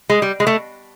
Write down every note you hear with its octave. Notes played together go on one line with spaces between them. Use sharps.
G#3
G3
G#3
A3